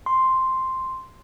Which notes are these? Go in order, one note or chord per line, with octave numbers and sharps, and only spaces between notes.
C6